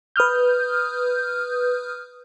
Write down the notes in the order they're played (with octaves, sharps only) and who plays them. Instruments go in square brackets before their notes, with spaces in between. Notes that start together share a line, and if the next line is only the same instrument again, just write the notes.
[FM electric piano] B4 D#6 F6 G6